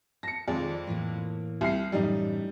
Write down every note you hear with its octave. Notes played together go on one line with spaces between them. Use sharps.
A5 A#6 C#7
F2 D#3 G#3 D5
A2 E3 A#3
C2 C7
F#2 A2 E3 G3 D#4